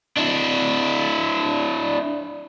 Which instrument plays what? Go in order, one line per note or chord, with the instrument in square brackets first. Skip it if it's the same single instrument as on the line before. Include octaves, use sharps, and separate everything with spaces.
[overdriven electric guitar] D4 E4